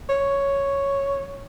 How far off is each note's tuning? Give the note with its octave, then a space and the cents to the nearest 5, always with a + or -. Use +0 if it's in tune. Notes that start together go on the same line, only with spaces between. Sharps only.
C#5 +0